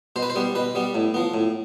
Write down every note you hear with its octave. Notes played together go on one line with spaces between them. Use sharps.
B2 C5
B4
C5
G3 B3
B2 B4
G3 B3
A2
F3 B3
A2